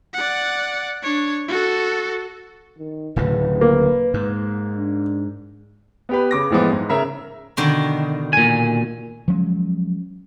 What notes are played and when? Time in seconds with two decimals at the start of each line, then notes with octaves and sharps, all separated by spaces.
0.14 D5 F#5
1.03 D4 C#5
1.48 F#4 A4
2.79 D#3
3.16 D1 A2 C#3 B4
3.61 A#3
4.14 G#2
4.77 D4
6.09 B3 G4 B4
6.31 C#3 D6 A#6
6.50 A2 E3 F3 G#3 B3
6.72 G#2
6.89 C#3 A#4 E5 A#5
7.57 B2 D3 D#3
8.33 A#2 G#5
9.28 F3 F#3 G#3 C#4